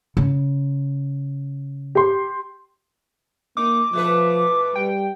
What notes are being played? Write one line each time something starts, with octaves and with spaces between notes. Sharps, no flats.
C#3
G4 C6
A#3 D#4 D6
B2 F3 A3 B4
G3 G5